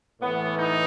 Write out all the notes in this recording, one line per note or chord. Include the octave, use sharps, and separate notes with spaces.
A2 E3 B3
D#4